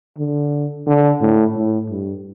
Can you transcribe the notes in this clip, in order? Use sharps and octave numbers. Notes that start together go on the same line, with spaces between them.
D3
D3
A2
A2
G2